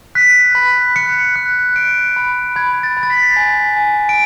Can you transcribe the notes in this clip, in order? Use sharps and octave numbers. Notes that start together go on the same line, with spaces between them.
F#6 B6
B5
F#6 C#7
F#6
F#6 D7
B5
B5 G#6
A6
B5
A6
B6
G#5
G#5
D7